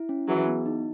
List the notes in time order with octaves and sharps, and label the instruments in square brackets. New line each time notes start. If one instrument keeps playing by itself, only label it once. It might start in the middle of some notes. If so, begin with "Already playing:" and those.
Already playing: [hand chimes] E4
C#4
[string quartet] E3 F#3 [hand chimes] G#4
[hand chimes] B3
D#4